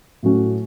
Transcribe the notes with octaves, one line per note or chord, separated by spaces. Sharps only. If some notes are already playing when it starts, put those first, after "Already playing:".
A2 F#3 A3 C#4 F#4